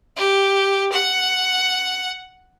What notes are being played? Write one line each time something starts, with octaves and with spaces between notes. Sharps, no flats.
G4
F#5